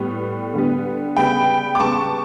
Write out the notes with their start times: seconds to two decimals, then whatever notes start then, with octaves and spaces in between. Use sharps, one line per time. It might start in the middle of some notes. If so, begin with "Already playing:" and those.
Already playing: A2 G3 B3
0.54 D3 G3 B3
1.16 C#3 G3 B3 G5 B5
1.75 D6
1.79 C#3 G3 B3 A5 C#6